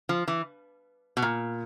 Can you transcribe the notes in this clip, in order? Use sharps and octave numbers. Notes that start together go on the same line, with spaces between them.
F3
E3
B2
A#2